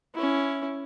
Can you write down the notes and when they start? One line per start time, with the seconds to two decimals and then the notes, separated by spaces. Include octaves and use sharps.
0.15 C#4 E4